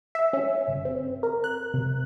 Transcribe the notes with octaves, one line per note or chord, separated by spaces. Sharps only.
E5
C#4
G1
C4
A#4
F#6
C3